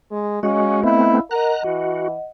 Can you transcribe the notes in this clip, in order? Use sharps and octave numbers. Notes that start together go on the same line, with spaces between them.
G#3
G#3 C#4 F#4 D#5 F5
A3 B3 C4 E4
A#4 D#5 F#5 A#5 F#6
E3 F#4